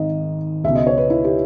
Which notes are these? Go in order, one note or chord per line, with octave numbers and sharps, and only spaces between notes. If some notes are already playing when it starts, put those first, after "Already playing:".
Already playing: G#1 G#2 D#3 D#5
C#2 B2 E5
D#5
C#5
B4
E4
G4